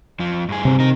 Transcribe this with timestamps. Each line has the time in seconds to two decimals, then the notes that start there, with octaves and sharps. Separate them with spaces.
0.19 F2 F3
0.49 G2 G#4
0.65 C3 C4
0.80 D#4 A#4